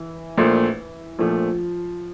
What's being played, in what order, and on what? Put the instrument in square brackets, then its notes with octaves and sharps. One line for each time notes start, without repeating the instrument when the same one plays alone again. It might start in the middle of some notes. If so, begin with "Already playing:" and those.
Already playing: [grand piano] E3
[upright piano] A#1 A#2 A3
[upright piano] A#1 A#2 A3 [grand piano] F3